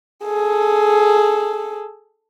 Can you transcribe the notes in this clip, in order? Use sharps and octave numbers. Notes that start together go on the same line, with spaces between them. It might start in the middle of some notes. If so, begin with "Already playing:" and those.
G#4 A4